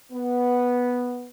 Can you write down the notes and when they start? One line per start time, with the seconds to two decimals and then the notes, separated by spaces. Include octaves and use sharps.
0.12 B3